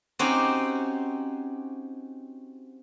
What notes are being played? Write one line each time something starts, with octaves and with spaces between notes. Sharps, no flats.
C4 C#4 D#4 F#4 G4 C#5